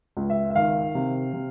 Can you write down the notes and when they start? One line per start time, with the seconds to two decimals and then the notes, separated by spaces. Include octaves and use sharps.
0.17 C#2
0.30 E5
0.50 E5
0.55 D#3 F5
0.95 C3
1.33 C3